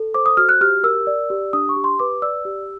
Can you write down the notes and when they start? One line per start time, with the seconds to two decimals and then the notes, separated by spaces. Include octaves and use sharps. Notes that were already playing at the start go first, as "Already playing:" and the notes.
Already playing: A4
0.14 C5 D6
0.26 D#6
0.37 F#4 F6
0.49 F#6
0.61 G4 F6
0.84 A#4 E6
1.07 D5
1.30 G4
1.53 D4 D#6
1.69 C#6
1.76 G4
1.84 C6
1.99 B4 D6
2.22 D5 E6
2.45 G4